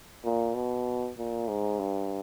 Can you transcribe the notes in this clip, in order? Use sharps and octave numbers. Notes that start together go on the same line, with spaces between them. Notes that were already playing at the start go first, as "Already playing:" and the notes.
A#2
B2
A#2
G#2
G2